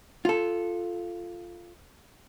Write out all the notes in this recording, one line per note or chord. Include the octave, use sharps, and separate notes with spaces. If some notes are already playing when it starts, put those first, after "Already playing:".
F4 A4